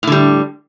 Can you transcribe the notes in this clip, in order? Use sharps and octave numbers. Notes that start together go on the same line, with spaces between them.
A2 D3 G3